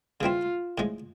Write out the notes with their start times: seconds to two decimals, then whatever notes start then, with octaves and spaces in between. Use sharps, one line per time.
0.21 C#3 E3 G3 C4 F4
0.78 A2 F3 G#3